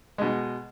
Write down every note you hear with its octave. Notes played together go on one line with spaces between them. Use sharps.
B2 G#3